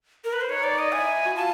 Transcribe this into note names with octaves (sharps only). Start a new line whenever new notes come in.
A#4
B4
C5
D#4 C#5
D5
D#5
E4 G#5
F#4
F4 A5